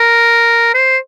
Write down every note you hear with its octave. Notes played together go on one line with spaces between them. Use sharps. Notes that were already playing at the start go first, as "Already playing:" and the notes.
Already playing: A#4
C5